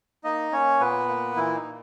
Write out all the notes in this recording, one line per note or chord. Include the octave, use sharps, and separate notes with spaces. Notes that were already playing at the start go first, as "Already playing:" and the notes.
A#3 D#4 D#5
A#3 C#4 C#5
A#2 B3 B4
A#3
A#2 E3 E4
D#4
A#2